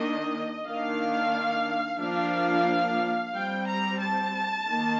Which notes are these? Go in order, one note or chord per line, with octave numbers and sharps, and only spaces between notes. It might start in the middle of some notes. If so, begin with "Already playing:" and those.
Already playing: D#3 A#3 D4 D#5
D#3 A#3 D4 F5
F3 A#3 D4 F5
G3 C4 G5
A#5
A5
D#3 A#3